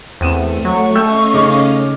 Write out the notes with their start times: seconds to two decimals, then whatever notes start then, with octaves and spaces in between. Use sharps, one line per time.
0.21 E2 A3 C4 D#7 E7
0.65 F#3 C#6
0.95 A3 C#4 D#5 F5 G5 E6 G6
1.34 C#3 D#4 D6